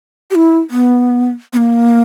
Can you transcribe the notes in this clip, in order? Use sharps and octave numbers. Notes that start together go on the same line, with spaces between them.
G4
E4
B3
B3
A#3